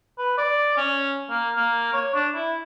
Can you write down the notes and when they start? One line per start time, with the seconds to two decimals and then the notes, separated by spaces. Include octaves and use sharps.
0.18 B4
0.38 D5
0.77 C#4
1.30 A#3
1.57 A#3
1.93 C#5
2.14 D4
2.35 E4